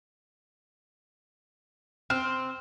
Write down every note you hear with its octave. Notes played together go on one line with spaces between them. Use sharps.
C4 F6